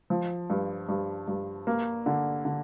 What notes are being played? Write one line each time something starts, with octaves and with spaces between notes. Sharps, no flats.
F3
G2
G2
G2
A#3
D3
D3